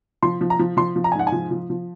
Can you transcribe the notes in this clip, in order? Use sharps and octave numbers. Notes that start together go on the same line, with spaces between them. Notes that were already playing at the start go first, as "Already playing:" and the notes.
F3 C6
F3
A#5
F3
F3 C6
F3
A#5
G#5
G#2 F#5
G#5
F3
F3
F3